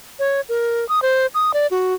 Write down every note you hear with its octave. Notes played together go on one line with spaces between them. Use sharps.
C#5
A#4
D#6
C5
D#6
D5
F#4